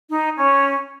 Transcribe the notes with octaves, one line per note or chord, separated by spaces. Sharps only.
D#4
C#4